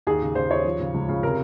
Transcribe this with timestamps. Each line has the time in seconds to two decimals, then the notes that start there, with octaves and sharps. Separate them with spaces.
0.07 D#2 G#4
0.22 C#3
0.35 C#3 C5
0.50 D#2 C#5
0.65 F3
0.80 C#3
0.94 C#2
1.09 C#3
1.23 C3 A#4